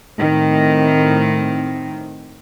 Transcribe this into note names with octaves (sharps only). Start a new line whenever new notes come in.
A2 D#3 C4